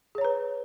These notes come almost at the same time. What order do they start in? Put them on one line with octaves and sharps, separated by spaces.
G#4 C#5 A#5 B4